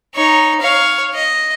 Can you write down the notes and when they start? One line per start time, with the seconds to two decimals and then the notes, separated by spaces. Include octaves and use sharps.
0.15 D#4 C#5
0.60 C#5 F5
1.14 D#5